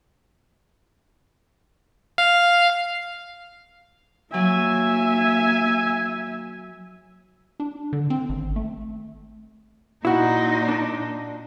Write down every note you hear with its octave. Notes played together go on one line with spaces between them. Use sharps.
F5
F#3 A#3 E5 G#5
D4
D3
C4
G#1
A3
A#2 D#4 E4 F#4
D4